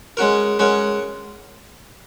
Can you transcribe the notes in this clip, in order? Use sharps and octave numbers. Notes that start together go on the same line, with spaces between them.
G#3 C#4 F#4 A#4
G#3 C#4 F#4 A#4